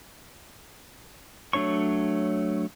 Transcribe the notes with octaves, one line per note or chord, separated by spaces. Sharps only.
F#3 A3 D4 C#5 C#6